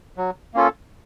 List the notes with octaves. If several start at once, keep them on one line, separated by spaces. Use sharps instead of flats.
F#3
A#3 C#4 F4 A4